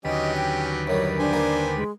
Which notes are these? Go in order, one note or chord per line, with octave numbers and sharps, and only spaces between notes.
D#2 D3 F#3 C#4 G4 B4 D#5
G5
F#2 D#3 G3 C#5
D4 G4 C5 G#5
G3 A#3
G#3